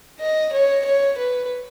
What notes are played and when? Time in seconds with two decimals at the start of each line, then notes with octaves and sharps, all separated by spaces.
0.20 D#5
0.53 C#5
0.85 C#5
1.18 B4